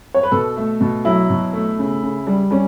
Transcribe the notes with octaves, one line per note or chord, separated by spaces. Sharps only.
C#5
B4
B2 A4
A3
B2
F#3 E4
B2
A3
C#3
C#3
G3
G3 C#4